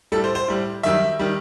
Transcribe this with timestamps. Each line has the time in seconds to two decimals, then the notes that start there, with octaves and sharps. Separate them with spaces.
0.12 A2 G3 A4
0.24 C5
0.35 C5
0.48 A2 G3
0.83 F#2 D#3 G3 E5
1.19 D#3 G3